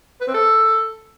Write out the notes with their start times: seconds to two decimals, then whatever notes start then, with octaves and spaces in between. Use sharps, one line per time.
0.21 B4
0.27 C4
0.34 A4